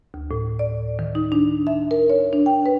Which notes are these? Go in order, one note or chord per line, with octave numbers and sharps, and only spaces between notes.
D2
A2
D5
D#3
D#4
D4
E5
A#4
C#5
D4
G5
B4